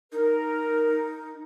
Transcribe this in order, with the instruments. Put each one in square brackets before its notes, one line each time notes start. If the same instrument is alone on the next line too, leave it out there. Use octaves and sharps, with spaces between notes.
[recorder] D#4 [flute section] A#4